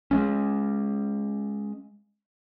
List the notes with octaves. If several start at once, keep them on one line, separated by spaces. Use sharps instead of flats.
G#3 A3 C#4